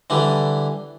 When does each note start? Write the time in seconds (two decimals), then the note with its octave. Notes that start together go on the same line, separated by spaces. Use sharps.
0.10 D3 E3 G3